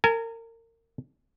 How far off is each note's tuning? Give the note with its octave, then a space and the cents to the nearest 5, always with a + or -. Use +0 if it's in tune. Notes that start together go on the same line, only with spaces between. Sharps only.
A#4 -30 G#5 +20